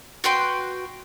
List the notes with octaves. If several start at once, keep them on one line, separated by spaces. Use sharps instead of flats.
F#4 B4 G5 C6